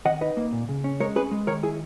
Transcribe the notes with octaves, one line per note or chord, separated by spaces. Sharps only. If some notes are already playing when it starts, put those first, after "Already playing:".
D#3 D#5 F#5
D#4 B4 D#5
A#3
A#2
C#3
C#4
G#3 A#4 C#5
C#4 G#4 B4
G#3
D#3 A#4 C#5
E4 G#4